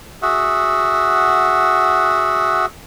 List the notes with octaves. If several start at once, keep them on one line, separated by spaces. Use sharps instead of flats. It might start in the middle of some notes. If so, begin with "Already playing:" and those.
F#4 G#4 E5 F#5